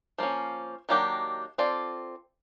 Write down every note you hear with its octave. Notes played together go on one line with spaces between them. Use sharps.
F3 A#3 C#4
D#3 F#3 A#3 D4 G4
C4 F4 A4 D5